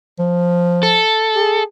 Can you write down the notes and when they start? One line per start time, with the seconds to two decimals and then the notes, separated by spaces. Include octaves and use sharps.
0.19 F3
0.83 A4
1.36 G#4